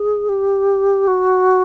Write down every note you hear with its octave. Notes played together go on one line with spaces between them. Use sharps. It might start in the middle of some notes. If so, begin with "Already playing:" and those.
Already playing: G#4
G4
F#4